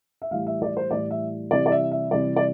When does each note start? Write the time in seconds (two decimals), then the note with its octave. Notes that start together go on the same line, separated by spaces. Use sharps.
0.22 E5
0.31 A2 E3 G3 F5
0.47 E5
0.62 D5
0.77 C5
0.91 A2 E3 G3 D5
1.11 E5
1.51 C3 E3 G3 D5
1.66 D5
1.72 E5
1.91 E5
2.11 C3 E3 G3 D5
2.36 D5